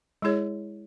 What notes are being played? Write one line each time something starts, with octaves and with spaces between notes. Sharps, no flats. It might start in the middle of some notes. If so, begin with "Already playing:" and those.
G#3 E4 G#4 C#5